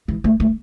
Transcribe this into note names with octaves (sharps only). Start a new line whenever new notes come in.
E3
A3
A3